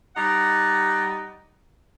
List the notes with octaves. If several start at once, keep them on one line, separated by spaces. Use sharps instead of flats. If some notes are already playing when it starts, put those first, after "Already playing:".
G3 D#4 F#5